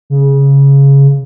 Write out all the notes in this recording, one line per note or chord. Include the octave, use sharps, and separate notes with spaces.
C#3